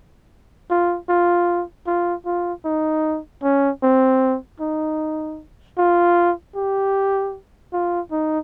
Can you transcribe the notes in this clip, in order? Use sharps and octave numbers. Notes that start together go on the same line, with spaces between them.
F4
F4
F4
F4
D#4
C#4
C4
D#4
F4
G4
F4
D#4